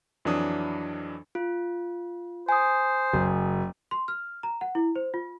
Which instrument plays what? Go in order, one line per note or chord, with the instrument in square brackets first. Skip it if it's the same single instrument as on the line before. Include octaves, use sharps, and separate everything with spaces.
[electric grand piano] F2 E3 F#3 D4 D#6
[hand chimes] F4
[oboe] C5 [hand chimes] G#5 D#6
[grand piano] F#1
[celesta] C6
F6
A#5
F#5
E4
C5
F4